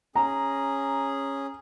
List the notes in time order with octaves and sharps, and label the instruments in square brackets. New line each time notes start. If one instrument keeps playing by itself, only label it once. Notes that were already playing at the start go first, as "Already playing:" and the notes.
[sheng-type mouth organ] C#4 G#4 [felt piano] A#5